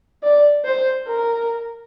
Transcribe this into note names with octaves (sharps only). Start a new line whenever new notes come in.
D5
C5
A#4